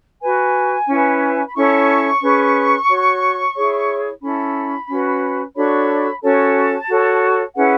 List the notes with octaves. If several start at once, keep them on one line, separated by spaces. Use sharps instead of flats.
F#4 B4 G#5
C#4 E4 B4
B5
C#4 E4 A4 C#5 C#6
C#4 G#4 B4
F#4 C#5
E4 G#4 C#5
C#4 E4 A4 B5
C#4 F#4 B4
D4 F#4 A4 C#5 B5
C#4 F#4 A4 C#5 A5
F#4 A4 C#5
C#4 E4 G#4 B4 F#5